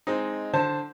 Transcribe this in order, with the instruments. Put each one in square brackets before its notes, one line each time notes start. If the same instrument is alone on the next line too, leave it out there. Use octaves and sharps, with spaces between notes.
[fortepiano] G#3 C4 D#4
D3 C5 A5